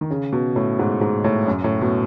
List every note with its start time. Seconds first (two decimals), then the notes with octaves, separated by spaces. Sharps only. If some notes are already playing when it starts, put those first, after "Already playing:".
0.01 D#3
0.11 C#3
0.33 B2
0.56 A2
0.79 G#2
1.01 G#2
1.24 A2
1.47 F#2
1.64 A2
1.81 B2